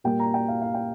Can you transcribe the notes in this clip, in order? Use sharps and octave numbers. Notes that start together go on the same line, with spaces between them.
A#2 G3 A#3 G5
A#5
G5
F5
F5
G5